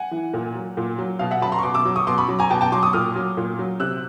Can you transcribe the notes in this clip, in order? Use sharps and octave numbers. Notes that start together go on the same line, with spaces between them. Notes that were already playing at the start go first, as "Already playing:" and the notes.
Already playing: F#5 G#5
E3
A#2
F#3
A#2
F#3
B2 F5
E5 F#5
F#3 A5 B5
A#5 C6
C#6
B2 C6 D6
D6 E6
F#3
C#6 D#6
B2 C6 D6
B5 C#6
F#3
G#5 A#5
B2 G5 A5
G5 A5
F#3 C6 D6
C#6 D#6
A#2 D#6 F6
F#3
A#2
F#3
C3 E6 F#6